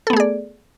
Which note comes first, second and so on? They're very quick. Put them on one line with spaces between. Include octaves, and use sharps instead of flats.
A4 B3 A3 G#4 D5